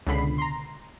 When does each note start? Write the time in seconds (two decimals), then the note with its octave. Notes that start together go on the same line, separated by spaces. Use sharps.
0.07 C#2 B2 D3 B5 C7
0.38 A#5 C6